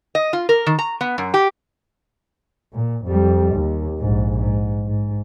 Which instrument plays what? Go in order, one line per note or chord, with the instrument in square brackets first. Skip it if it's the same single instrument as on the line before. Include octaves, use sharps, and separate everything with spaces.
[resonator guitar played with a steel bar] D#5
F4
A#4
D#3
A#5
B3
F#2
G4
[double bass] A#2
F2 G3
D#2
A#1 G#2
G#2
G#2